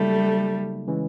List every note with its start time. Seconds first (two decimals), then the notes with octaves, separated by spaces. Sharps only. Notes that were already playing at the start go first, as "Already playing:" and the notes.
Already playing: C#3 F#3 G3 A3 A#3 D#4
0.87 C#3 E3 G#3 C#4